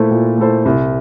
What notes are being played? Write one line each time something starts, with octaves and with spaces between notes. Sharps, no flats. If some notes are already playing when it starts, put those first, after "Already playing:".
Already playing: A#2 A3 E4 A4 C5
A#2
A3 E4 A4 C5
C2